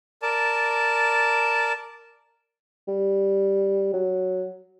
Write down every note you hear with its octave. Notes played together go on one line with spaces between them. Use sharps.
A#4 D5 A5
G3
F#3